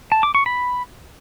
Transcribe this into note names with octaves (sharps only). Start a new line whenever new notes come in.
A5
D6
C#6
B5